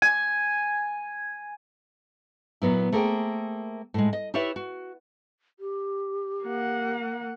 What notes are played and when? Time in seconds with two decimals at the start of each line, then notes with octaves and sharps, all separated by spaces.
0.02 G#5
2.62 A#2 F#3 B3 E4
2.92 A3 A#3 G#4 C5 G5
3.94 A2 G#3
4.13 D#5
4.34 E4 G4 B4 C#5 D5 E5
4.56 F#4
5.60 G4
6.44 A#3 F#5